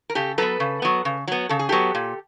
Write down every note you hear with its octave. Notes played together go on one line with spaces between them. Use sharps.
A#4
C#3 G4 A4
F#3 B3 A4 B4
C#3
F#3 B3
C#3
F#3 B3
C#3 A4
G#4
F#3 B3 G4 A4
A#2